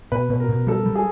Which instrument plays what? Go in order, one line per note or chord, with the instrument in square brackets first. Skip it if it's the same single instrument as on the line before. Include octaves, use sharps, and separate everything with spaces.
[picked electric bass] B2 [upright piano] B4
[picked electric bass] B2 [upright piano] B4
[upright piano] A#4
[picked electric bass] B2
[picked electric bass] G3 [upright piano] A4
[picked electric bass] G3
[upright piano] G#4